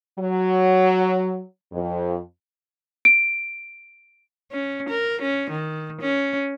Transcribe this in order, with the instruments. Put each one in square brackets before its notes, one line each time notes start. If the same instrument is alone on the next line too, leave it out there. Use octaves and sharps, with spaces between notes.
[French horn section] F#3
F2
[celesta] D7
[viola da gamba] C#4
A#4
C#4
D#3
C#4